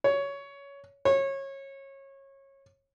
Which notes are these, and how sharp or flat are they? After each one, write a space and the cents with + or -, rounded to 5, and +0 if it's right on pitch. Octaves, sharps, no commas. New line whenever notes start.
C#5 +15
C#5 -25